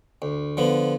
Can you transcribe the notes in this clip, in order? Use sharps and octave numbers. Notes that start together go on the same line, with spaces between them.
D2
D3 F3 B3